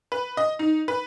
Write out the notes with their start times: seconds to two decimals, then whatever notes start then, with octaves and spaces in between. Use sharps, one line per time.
0.12 B4
0.37 D#5
0.59 D#4
0.88 B4